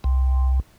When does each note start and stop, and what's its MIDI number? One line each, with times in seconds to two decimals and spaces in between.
0.04 0.60 36